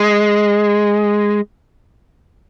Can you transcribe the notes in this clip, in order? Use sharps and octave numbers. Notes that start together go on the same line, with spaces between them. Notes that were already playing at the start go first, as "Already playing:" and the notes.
Already playing: G#3